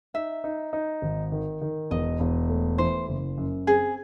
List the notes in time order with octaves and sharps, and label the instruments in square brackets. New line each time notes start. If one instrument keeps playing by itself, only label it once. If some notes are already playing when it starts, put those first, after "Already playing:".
[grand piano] D#4 [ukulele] E5
[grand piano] D#4
D#4
G#1
D#3
D#3
[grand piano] E1 [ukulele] D#5
[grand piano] E1
A3
[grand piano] E3 [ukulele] C5
[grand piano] F#1
F#2
[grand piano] C4 [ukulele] G#4